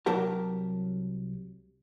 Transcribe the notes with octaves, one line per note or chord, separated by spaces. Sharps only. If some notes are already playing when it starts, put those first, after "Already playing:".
C2 F#3 F#4 G4 A#4 A5